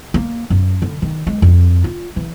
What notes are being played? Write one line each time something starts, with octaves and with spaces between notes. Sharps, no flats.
A#3
F#2
D3
D#3
G#3
F2
F4
E3